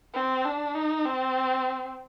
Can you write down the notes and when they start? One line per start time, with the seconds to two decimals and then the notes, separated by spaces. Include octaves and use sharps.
0.14 C4
0.45 D4
0.75 D#4
1.05 C4